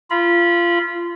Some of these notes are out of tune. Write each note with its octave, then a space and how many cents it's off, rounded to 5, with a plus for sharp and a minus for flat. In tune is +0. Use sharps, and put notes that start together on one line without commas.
F4 -20 B5 -25